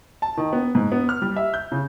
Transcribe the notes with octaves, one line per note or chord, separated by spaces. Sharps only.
A5
D#3
B3
G#2
B3
F6
G3
E5
G6
C#3